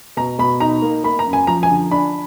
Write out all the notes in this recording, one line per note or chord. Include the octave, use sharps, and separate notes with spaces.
B2 A#5
B2 B5
D#4 A#5
A#3
A#3 B5
A#5
F#2
G#5
F3 A#5
G#5
D3
D4 B5